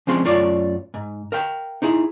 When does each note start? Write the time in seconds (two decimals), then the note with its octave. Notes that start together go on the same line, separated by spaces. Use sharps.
0.07 F3 G#3 C4 C#4 G#4 C6
0.25 F#2 A3 F4 C#5 D5
0.94 G#2
1.32 A#4 F5 G5
1.82 D#4 E4 G#4